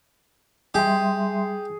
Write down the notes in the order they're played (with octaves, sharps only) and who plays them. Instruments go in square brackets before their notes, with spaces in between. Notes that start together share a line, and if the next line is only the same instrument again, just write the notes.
[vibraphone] G3 E5 C6 [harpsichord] G4 [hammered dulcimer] G#4